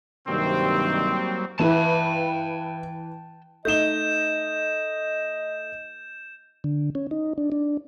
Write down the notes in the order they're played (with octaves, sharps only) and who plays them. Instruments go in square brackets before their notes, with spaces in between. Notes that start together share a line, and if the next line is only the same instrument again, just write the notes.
[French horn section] G2 C3 D#3 [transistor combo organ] F#3 G3 A#3 [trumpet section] C4
[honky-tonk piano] E3 B4 [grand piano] E4 [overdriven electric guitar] G5 A5
[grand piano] A3 D#4 G7 [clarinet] D#5 [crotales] G6 E7
[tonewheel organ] D3
C#4
D#4
D4
D4